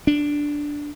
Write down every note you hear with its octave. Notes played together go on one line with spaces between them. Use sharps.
D4